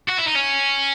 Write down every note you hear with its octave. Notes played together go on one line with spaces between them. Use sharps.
F#4
E4
D#4
C#4